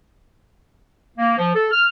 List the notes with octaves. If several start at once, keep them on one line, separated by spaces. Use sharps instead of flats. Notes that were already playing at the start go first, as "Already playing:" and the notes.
A#3
F3
A4
F6